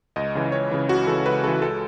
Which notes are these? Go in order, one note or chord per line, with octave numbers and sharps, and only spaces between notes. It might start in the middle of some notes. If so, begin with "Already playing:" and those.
C#2 D#5
C#3 E3
C#2 C#5
C#3 E3
C#2 F#4
C#3 E3 A4
C#2 B4
C#3 E3 A4
C#2 A4